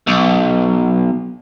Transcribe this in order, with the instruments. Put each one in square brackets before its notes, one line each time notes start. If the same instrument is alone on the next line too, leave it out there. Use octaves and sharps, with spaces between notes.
[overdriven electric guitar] B1